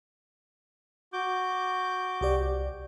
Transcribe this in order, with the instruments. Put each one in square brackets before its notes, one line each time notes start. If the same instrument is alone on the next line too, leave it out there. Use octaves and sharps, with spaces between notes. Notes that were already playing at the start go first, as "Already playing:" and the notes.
[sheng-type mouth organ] F#4 D6 G6
[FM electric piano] C2 G4 D5